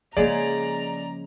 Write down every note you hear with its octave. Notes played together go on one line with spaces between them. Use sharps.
C#3 F3 G#3 A#3 G#4 D5 A#5